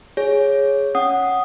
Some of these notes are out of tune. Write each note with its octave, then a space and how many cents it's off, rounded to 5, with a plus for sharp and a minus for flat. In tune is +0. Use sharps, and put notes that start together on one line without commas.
G#4 +0 C#5 -5
C#4 +0 F#5 +0 D#6 +0